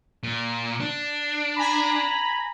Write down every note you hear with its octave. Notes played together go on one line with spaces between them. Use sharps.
A#2
D4
G#5 A#5 B5